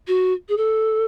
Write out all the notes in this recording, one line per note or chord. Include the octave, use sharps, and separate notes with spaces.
F#4
G#4
A4